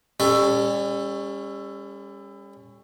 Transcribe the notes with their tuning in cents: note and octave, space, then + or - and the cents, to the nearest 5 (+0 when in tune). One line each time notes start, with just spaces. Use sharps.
G3 +40 C#4 +0 A4 +10